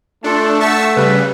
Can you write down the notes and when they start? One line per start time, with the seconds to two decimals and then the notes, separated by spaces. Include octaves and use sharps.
0.24 A3 D4 F4 A4
0.61 A4 E5 F#5 A5 C#6 E6
0.97 C#3 G3 B4